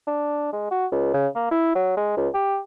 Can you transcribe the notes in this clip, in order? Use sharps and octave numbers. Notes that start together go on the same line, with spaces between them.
D4
G#3
F#4
C#2
C#3
A#3
E4
F#3
G#3
C#2
G4